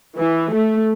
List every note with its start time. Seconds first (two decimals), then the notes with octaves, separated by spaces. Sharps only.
0.19 E3
0.53 A3